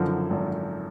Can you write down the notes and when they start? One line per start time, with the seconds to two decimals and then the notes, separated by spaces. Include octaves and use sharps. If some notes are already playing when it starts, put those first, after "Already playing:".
Already playing: F#2 D3 F3
0.30 G#1